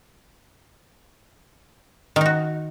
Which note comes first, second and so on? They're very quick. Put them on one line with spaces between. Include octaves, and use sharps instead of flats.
D#3 D#4 F#4